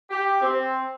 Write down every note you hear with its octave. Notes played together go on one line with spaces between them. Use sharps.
G4
C4